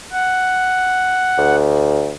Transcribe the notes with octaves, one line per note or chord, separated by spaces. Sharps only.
F#5
D2